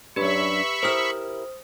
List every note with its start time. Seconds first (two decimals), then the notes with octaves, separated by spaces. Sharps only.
0.16 F#2 D4 G4 B4 E5 B5 C#6
0.83 E4 G4 A#4 C5 D#6 F6